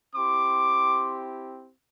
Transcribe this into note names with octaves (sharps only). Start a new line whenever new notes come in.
C4 E4 G4 C6 D6